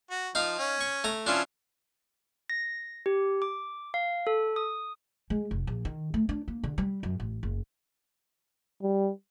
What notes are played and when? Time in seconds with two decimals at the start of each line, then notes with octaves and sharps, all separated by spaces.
0.10 F#4
0.35 F3 D#4 F5
0.58 C#4
0.81 C#6
1.04 A3 A#5
1.27 F3 C#4 D4 E4 F4
2.50 A#6
3.06 G4
3.42 D6
3.94 F5
4.27 A4
4.56 D#6
5.30 G#3
5.51 F1
5.67 A#1
5.85 D#3
6.14 A3
6.29 D4
6.48 A#3
6.63 D3
6.78 G3
7.03 F#2
7.20 A1
7.43 F#1
8.82 G3